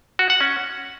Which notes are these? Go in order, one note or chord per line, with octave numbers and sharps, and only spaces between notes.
F#4
F#5
C#4